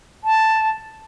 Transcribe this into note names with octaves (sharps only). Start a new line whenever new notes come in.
A5